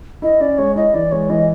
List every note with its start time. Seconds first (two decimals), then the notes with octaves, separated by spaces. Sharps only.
0.22 E4 D#5
0.40 C#4 D5
0.58 G#3 C#5
0.76 E4 D#5
0.94 E3 D5
1.12 G#3 C#5
1.30 E3 D#5